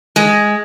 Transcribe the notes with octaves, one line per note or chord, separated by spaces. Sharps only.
G#3